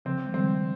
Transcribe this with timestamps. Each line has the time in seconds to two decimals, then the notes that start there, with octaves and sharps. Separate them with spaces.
0.05 C#3 F3 C4
0.26 G#3
0.34 D#3 G3 C4